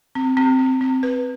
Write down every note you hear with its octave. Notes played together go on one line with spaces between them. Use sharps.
C4
C4
C4
C4
B4